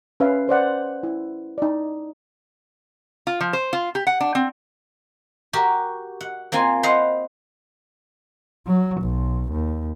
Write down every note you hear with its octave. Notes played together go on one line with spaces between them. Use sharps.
C#4 B4 E5 F5
B4 C5 D5 F#5
E4
D#4 D5
F4
F3
C5
F4
G4
F#5
D4
C4
F#4 G4 A#4
F#5
A#3 C4 F4 G#5
B4 C5 D#5 F5 F#5
F#3
B1
D#2